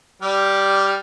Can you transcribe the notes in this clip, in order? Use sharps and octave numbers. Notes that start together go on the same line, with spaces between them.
G3 D5 F6